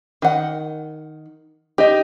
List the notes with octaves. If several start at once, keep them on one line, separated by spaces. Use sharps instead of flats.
D#3 F#5
D#4 G4 D#5